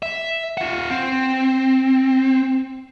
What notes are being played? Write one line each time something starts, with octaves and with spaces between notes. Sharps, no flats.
E5
F4 F#5
C4